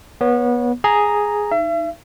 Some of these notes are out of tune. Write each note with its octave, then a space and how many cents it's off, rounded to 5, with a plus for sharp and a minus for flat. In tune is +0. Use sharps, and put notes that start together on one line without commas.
B3 -25 C#5 +0
G#4 +0 A#5 +0
D#4 +0 E5 +40